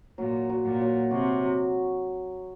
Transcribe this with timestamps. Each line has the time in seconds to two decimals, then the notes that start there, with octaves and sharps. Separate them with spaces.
0.18 A#2 F#3
0.50 F#3
0.65 A#2
0.81 F#3
1.11 C3 F#4
1.42 F#3